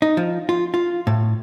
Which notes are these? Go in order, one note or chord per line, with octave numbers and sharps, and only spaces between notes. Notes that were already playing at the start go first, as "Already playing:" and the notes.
D#4
F3
F4
F4
A2